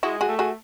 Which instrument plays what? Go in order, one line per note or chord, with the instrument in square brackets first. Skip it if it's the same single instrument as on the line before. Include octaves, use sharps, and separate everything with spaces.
[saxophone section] G#3 [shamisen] E4 F#4
[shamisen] F#4 G#4
[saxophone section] A3
[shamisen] F#4 G#4